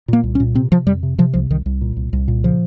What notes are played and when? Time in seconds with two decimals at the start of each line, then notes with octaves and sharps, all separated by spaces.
0.08 A#2 A#3
0.24 C2
0.35 C#4
0.40 A#2
0.55 C3 C4
0.72 C3 F3
0.86 F2 G3
1.03 C3
1.18 C3 F3
1.33 C2 F3
1.50 C2 D#3
1.66 C2
1.81 A#2
1.97 C2
2.13 C2
2.28 A#2
2.44 C#3 F3